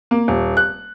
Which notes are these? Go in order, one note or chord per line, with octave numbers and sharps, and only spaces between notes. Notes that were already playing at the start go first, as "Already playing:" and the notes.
A#3
D#1
F#6